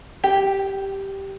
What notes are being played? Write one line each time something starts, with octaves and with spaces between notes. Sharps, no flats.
G4